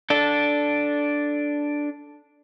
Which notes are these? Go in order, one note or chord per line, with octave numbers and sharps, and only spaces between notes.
D4 A4